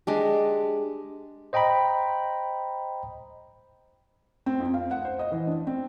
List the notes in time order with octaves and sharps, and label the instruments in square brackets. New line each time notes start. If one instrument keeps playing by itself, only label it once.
[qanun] G#3 D4 G4
[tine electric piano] C5 D#5 G5 A#5 B5
[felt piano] C4
F2
F5
F#5
C5
D#5
E3
D4
C4